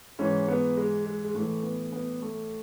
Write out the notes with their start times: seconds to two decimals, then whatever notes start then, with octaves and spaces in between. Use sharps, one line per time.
0.19 G#2 E3 C#4
0.48 B3
0.77 G#3
1.05 G#3
1.24 G#3
1.35 A2 E3 A3
1.63 B3
1.92 B3
2.22 A3